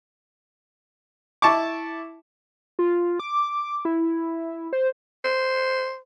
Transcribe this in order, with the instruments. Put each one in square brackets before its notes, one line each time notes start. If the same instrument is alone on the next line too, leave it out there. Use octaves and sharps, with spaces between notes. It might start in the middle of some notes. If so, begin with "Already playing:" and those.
[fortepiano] E4 A5 C#6 D6
[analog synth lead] F4
D6
E4
C5
[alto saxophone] C5